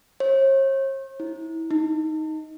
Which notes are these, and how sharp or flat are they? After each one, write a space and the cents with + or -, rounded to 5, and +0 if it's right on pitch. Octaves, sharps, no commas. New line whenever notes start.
C#5 -45
E4 -25
D#4 +10